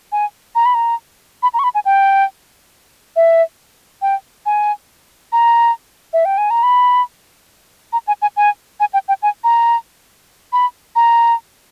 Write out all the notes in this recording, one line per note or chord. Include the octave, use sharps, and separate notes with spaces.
G#5
A#5
B5
A#5
B5
A#5
C#6
B5
G#5
G5
E5
G5
G#5
A#5
E5
G5
G#5
A#5
B5
A#5
G#5
G#5
G#5
G#5
G5
G5
G#5
A#5
B5
A#5